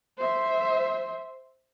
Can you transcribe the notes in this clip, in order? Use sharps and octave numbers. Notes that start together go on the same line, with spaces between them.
C5 E5